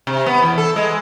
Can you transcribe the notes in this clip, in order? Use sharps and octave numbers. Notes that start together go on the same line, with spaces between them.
C3
B3
E2
A4
G#3